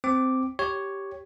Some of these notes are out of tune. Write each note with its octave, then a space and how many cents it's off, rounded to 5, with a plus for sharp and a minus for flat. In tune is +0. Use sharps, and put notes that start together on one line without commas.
C4 -10 D6 +0
G4 -5 C#5 +0